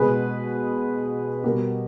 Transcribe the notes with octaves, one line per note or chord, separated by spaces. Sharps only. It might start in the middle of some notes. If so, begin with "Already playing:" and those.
Already playing: B2 G#3 G#4 B4
B2 G3 G4 A#4